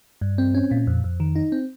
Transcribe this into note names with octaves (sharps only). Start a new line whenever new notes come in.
G2
C4
C#4
A#2
F2
F2
D#3
D#4
C4